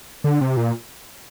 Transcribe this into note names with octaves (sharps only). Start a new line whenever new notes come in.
D3
C3
A#2